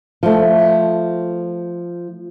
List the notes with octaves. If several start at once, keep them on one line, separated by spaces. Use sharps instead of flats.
F3 A3